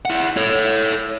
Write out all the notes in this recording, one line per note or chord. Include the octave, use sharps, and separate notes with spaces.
E4 F#5
A4 C#5